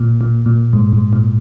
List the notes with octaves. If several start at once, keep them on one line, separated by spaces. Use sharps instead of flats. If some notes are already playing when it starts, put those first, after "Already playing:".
Already playing: A#2
A#2
A#2
G#2
G#2
A#2